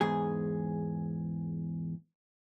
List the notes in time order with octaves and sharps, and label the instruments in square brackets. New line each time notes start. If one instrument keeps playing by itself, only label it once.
[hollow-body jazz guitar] E2 G#2 G#4